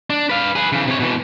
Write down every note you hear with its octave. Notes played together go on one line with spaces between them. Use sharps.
D4
B4 F5
G#4 B4
C#3 E3
C3 C#5
B2 E3